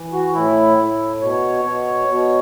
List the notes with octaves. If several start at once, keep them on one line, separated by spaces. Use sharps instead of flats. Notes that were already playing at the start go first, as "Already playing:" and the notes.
Already playing: E3
F#4
A2 E4
A2
B2 C#5
B2
B2